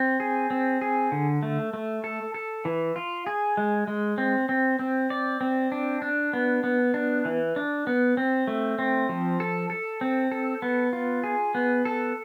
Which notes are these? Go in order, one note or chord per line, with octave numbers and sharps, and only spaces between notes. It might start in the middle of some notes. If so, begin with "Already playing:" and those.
Already playing: C4
G#4
C4
G#4
D3
A3
A3
A4
A4
E3
F4
G#4
G#3
G#3
C4
C4
C4
D5
C4
D4
D4
B3
B3
D4
E3
D4
B3
C4
A3
C4
F3
A4
A4
C4
A4
B3
F4
G#4
B3
A4